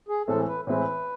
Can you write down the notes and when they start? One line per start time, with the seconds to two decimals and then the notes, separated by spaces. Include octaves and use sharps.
0.09 G#4
0.27 A2 E3 G#3 C4 E4 A4
0.47 B4
0.67 A2 E3 G#3 C4 E4 B4